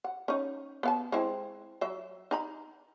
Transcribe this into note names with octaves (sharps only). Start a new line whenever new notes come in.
F#5
C#4 D#4
B3 F5 A5
G#3 C4 E4
F#3 E5
D#4 A#5 B5